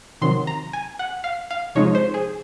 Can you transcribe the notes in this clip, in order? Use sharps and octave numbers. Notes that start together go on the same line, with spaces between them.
C3 D#3 F#3 C6
A#5
G#5
F#5
F5
F5
C3 F3 G#3 D#4 C#5
C5
G#4